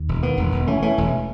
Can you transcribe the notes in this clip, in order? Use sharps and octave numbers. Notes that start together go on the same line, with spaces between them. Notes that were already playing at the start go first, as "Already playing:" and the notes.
Already playing: D#2
E1
D#3 B3
E1
E1
E3 A3 C#4
E3 A3 C#4
E1